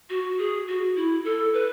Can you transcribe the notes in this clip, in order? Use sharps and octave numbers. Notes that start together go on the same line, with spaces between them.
F#4
G#4
F#4
E4
A4
B4